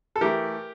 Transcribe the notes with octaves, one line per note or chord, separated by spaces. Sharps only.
A4
E3 A3 G4 A#4